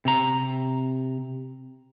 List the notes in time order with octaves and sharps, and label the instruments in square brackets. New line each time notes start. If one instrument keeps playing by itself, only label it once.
[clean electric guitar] C3 A#5